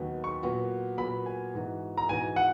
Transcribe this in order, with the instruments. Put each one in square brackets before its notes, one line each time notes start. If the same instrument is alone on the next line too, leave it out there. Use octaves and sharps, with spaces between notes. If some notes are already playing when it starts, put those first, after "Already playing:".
Already playing: [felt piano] D#2 D#3 F#3 B3
[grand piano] C#6
[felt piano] A#2 F#3 B3 F#4
[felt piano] A#2 F#3 B3 F#4 [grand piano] B5
[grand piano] G#5
[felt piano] G#2 E3 B3 F#4
[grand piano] A#5
[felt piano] G#2 E3 B3 F#4 [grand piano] G#5
[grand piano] F#5